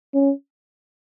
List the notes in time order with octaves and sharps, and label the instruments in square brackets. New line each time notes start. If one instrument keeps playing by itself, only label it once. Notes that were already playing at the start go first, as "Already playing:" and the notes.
[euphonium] C#4